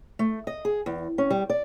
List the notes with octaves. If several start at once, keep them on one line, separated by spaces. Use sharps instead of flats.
A3
D#5
G#4
E2
C#4
G3
D5